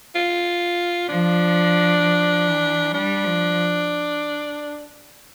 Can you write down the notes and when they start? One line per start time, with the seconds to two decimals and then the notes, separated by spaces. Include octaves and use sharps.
0.15 F4
1.08 F3 D4
2.00 F3
2.47 E3
2.94 G3 D4
3.24 F3